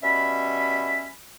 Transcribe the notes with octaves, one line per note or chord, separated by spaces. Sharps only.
B2 G3 C#4 E5 B5